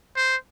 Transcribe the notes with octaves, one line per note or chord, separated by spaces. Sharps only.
C5